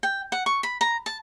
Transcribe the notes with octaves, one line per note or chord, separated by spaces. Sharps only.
G5
F#5
C#6
B5
A#5
A5